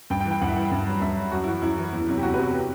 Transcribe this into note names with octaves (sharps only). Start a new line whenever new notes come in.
G2 G5
G5
E3
G5
G2 F#5
E5
E3 F#5
G2
F#3
G2 E5
F#3
F#2 F#4
E4
E3 F#4
F#2 E4
E3
E2
C3 F#3
G4
E2 F#4
B4
C3 F#3 F#4
G4